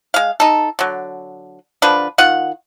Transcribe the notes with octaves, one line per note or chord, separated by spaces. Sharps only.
G#3 F5
D#4 A4
D3 F#3
D3 F3 D4 B4
D#3 F4 F#5